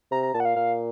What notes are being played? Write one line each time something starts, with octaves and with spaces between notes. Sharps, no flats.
C3 A#5
A#5
A#2 A5
F#5
F5
A#2 F5